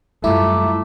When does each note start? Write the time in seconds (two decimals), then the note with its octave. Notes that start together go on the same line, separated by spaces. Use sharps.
0.24 F#2 G3 A3 E4 F4 E5 A#5 D6